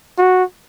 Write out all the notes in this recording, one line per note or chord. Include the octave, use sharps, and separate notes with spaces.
F#4